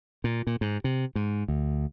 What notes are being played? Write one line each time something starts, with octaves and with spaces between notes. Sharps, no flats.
A#2
A#2
G#2
C3
G#2
D2